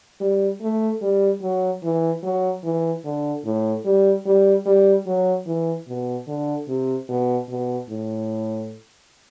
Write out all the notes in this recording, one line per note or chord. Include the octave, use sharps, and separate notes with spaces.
G3
A3
G3
F#3
E3
F#3
E3
D3
A2
G3
G3
G3
F#3
E3
B2
D3
C3
B2
B2
A2